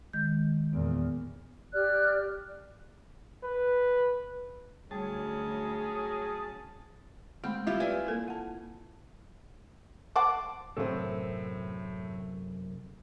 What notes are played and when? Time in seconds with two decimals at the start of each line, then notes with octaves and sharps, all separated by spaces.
0.13 D#3 G#3 G6
0.73 E2 A#2 B3
1.73 G4 D5 F6 F#6
3.43 B4
4.91 D2 F#3 G3 C#4 G#4 A5
7.44 G#3 A3 C4 B5
7.67 G3 E4 F4 G4
7.80 B4 D5 E5 G#5
8.07 A#3 A4 A#4
8.28 F#5 A5
10.16 C5 F#5 A5 D6
10.77 F#2 A2 C3 C4 A4